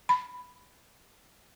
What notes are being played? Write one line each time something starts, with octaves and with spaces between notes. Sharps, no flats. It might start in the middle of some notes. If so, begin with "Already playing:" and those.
B5